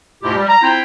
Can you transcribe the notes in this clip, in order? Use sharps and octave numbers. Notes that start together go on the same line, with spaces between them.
D2 G#2 B2 E4 F4 G4
G3
A#5
C4 E4 F4 G5